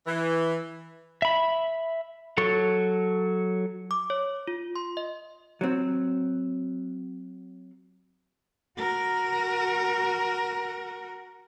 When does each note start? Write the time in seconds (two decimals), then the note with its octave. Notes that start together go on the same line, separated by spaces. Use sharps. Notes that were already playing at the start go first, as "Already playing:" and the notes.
0.06 E3
1.22 E5 B5
2.38 F#3 A4 C#6
3.91 D6
4.10 C#5
4.47 F4
4.76 C6
4.97 D#5
5.61 F#3 C4
8.78 F#4 A#4